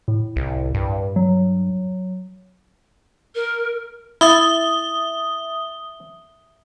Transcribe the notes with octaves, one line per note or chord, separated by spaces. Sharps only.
A2
C2
G2
F#3
A#4
E4 E5 D#6 G7